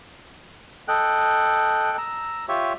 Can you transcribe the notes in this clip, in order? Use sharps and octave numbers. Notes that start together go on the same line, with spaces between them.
A4 D#5 G5 F#6
A#5 E6
F4 G4 C#5 E5